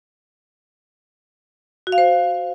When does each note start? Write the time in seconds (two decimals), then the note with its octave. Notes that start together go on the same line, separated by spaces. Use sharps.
1.87 F#4
1.92 F5
1.98 C5